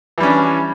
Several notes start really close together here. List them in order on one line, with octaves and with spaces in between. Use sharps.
E3 G3 C#4 D4